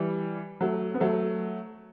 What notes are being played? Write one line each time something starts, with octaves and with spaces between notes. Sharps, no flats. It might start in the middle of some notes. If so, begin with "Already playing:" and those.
Already playing: E3 G3
F#3 A3
B3
F#3 A3